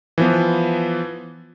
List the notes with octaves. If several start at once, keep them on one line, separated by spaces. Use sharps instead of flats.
E3 F3 B3